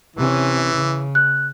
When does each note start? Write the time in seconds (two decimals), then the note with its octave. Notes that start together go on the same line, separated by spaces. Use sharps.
0.16 C3 E3 C#4
0.74 C#3
1.15 F#6